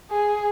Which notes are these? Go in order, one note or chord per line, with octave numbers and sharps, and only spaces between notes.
G#4